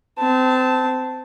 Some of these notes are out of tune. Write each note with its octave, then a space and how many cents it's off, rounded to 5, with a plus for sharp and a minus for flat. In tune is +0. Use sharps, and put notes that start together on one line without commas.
C4 -25 A5 +0